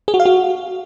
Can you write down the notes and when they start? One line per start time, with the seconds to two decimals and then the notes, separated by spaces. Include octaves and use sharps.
0.08 G#4
0.14 F#4
0.20 F5
0.25 F#4